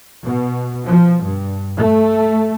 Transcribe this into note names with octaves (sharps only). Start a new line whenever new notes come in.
B2
F3
G2
A3